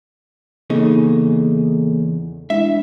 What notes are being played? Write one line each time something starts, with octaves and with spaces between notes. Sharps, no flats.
E2 C#3 A#3 D#4 G#4 A4
G#3 D4 E4 E5